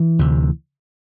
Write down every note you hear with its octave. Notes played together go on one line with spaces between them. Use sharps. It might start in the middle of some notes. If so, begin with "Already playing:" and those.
Already playing: E3
D2 C3